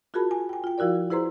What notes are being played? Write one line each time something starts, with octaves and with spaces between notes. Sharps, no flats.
F4 F#4 G#4 A#4 A5 B5
G#5
G5 G#5
F4 G5
F3 E4 F#4 A#4 D5
E4 G#4 B4 C5 A#5 C6